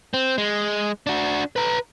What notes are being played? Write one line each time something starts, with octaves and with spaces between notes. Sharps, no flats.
C4
G#3
D4 F#4
B4 A#5